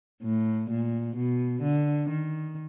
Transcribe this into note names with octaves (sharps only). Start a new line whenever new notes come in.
A2
A#2
B2
D3
D#3